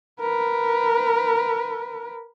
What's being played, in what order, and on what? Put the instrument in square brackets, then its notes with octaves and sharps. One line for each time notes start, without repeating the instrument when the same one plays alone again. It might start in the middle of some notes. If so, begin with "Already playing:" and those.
[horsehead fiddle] A#4 B4